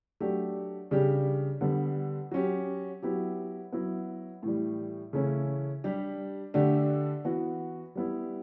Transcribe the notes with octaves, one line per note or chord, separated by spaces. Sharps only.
F#3 A3 D4 G4
C#3 G3 D4 G4
D3 G3 B3
F#3 C#4 G4
F#3 B3 E4 G4
F#3 B3 E4
A2 E3 G3
C#3 E3 A3 C#4 E4
G3 D4 G4
D3 A3 D4 G4
E3 B3 F#4
G3 B3 E4